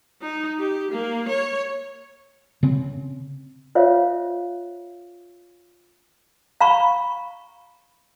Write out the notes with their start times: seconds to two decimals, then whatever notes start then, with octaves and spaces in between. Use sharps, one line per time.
0.22 D#4
0.58 G4
0.91 A#3
1.29 C#5
2.63 C#3 C4
3.75 F4 C5 C#5 E5 F5
6.61 F5 A#5 B5 C#6